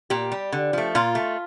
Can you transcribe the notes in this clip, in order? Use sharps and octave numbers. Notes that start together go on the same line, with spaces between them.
A#2 G4
G3
D3
F3 A3
A#2 F4
A3